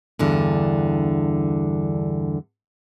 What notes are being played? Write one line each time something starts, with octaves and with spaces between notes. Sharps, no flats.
E2 G2 D3